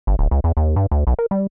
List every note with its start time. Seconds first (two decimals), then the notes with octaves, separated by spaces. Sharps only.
0.07 G1
0.19 D1
0.31 C#2
0.44 E2
0.57 D#2
0.76 G2
0.91 D2
1.07 B1
1.19 A#4
1.31 G3